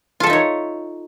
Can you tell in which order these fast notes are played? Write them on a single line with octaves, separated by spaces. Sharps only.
F4 A4 E5 D#4 C#5